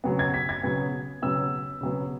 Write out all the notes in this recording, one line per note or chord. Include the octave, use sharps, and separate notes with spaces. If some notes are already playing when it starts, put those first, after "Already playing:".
C#3 F#3 B3
G#6
B6
G#6
C#3 F#3 B3
C#3 F#3 B3 E6
C#3 F#3 B3